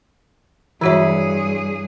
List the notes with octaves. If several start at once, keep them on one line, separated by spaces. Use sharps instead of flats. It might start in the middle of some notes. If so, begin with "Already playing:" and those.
G2 E3 F#3 E4 F#4 G#4 E5